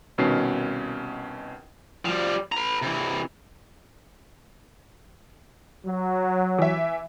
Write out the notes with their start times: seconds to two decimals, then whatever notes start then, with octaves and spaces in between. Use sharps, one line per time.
0.18 C2 B2 D#3 C#4 C7
2.05 F3 G3
2.52 B4 A#5
2.82 C3 E3
5.86 F#3
6.58 E3 E5